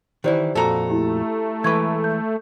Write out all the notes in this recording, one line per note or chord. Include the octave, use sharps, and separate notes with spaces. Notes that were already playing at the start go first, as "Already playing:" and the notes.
D#3 E3 E4 G4 C5 D5
F2 A#2 F#4 A4 A#5
A3 E4 G4
E3 G#3 B4 C#6 G#6
G6